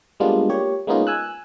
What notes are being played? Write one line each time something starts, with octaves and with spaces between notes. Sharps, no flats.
G3 G#3 A#3 B3 D4 F4
A#3 G4 C#5
G#3 A#3 B3 C#4 D#4 F4
G#5 E6 F#6